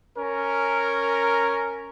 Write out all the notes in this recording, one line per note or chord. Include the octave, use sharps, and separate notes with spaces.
C#4 A#4